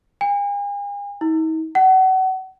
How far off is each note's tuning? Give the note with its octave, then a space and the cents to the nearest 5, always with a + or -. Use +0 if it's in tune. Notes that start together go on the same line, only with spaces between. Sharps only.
G#5 -45
D#4 +45
F#5 +30